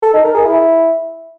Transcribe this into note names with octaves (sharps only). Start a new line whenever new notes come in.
A4
D#4
A#4
G#4
E4